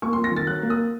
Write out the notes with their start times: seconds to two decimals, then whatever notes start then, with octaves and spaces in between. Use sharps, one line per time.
0.02 A#3 C#6
0.13 C6
0.17 F2
0.24 A#6
0.32 D#3 A6
0.47 F#3 F#6
0.63 A#3
0.70 D#6